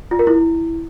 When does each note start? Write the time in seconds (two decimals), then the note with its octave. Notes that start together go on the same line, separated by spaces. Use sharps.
0.11 F4
0.19 A#4
0.27 E4